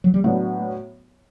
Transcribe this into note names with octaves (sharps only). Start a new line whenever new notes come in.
F#3
G3
A2 F#3 A3 B3 D4 F#4